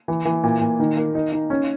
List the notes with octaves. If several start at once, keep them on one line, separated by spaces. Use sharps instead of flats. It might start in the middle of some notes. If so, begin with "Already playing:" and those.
E3
E3
A#2
A#2
D#3
A#3
D#4
D#4
C#4